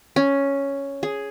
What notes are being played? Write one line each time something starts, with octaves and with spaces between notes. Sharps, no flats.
C#4
G#4